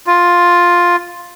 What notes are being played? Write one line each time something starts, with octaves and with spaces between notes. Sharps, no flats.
F4